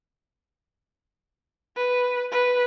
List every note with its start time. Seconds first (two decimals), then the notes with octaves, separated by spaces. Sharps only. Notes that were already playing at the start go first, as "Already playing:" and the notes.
1.77 B4
2.32 B4